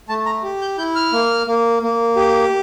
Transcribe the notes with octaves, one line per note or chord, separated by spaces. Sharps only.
A3 A5
A#5
G4
G6
E4 G6
F6
A#3
A#3
A#3
G4